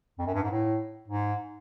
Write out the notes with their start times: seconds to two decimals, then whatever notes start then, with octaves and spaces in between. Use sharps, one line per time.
0.18 F2
0.26 F#2
0.34 G2
0.43 G#2
0.51 A2
1.08 G#2